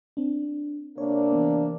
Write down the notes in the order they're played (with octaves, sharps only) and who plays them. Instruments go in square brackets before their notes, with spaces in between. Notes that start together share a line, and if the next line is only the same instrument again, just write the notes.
[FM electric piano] C4 D4
[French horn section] C3 A#3 D4 [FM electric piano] C#5
[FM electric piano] E3 B3